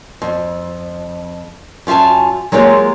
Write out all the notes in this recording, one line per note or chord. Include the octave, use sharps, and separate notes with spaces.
F2
F#2 F4 E5 G#5 A5
F#3 G#3 A#3 F4 G4 C#5